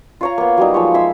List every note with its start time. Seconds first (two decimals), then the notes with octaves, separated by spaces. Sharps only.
0.21 F4 C#5 A#5
0.38 A#3 B3
0.57 F#3 G3 D#4
0.74 F3 G#3 F4 C#5
0.94 G#3 E5 C6 E6